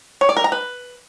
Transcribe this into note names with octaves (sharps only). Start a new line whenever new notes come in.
C#5
D5
A#4
A#5
B4